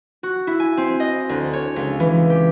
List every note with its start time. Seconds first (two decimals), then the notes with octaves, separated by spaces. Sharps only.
0.23 F#4
0.47 E4
0.60 G#5
0.77 C4
1.00 D#5
1.29 D2
1.53 C#5
1.76 C#2
2.00 E3
2.30 G4